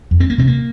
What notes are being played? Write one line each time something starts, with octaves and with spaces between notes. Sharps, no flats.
F2
C4
A#3
C3 C4
A#3